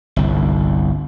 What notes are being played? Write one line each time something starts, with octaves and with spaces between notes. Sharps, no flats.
G1 C2